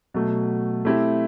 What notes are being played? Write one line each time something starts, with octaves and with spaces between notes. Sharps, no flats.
B2 F#3 A3
A3 C4 E4 G4